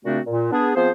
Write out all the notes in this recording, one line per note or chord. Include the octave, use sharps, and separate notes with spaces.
A#2 C#3 A3 C4 D4 F#4
A#2
B3 D4 G#4
F3 B3 C4 G#4 C5